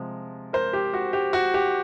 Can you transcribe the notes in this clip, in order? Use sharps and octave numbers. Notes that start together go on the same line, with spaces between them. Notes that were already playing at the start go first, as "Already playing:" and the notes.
Already playing: C3 F3 G#3
A#4 C5
G4
F#4
G4
F#4
G4